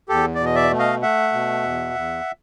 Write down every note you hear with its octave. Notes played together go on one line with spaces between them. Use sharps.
E2 G4 A4
D5
B2
D#5
D5 E5
A3
D#5 F5
A3 E5 F#5
B2
E2
E2